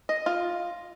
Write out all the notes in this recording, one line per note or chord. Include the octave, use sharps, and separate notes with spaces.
D#5
F4